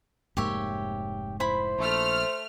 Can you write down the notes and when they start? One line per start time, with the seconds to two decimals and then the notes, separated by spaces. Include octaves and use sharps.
0.37 F1 G#2 A#3 G4 C#5 E5
1.40 E4 C5 B5
1.79 A#1 A3 F6